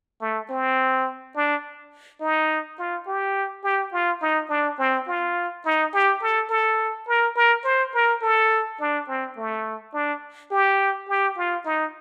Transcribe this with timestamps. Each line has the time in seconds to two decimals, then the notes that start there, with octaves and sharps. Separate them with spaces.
0.21 A3
0.49 C4
1.35 D4
2.21 D#4
2.79 F4
3.07 G4
3.64 G4
3.92 F4
4.22 D#4
4.50 D4
4.79 C4
5.08 F4
5.65 D#4
5.94 G4
6.22 A4
6.50 A4
7.08 A#4
7.36 A#4
7.64 C5
7.94 A#4
8.21 A4
8.80 D4
9.08 C4
9.37 A3
9.94 D4
10.51 G4
11.09 G4
11.37 F4
11.65 D#4